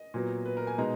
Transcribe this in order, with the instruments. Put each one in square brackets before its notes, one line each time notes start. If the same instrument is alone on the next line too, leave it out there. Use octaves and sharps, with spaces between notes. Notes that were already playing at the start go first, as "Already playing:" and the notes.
Already playing: [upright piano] D#5
A#2 F#3 B3
B4
A#4
G#5
B2 G#3 D#4 A#5